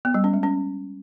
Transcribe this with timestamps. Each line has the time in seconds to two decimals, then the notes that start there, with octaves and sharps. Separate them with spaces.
0.05 B3
0.14 G3
0.24 C#4
0.34 G#3
0.43 C#4